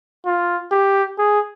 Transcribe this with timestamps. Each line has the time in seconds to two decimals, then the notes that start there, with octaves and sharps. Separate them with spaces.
0.26 F4
0.72 G4
1.18 G#4